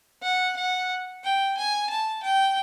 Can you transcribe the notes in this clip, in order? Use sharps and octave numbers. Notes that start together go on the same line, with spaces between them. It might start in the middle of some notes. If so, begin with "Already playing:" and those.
F#5
F#5
G5
G#5
A5
G5